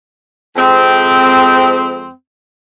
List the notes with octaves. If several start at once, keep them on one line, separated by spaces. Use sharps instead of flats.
F2 G#3 C4